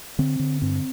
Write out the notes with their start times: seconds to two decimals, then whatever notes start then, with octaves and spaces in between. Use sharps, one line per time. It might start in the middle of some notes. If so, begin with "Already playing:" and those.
0.19 D3 C4
0.39 D3
0.62 G2 C4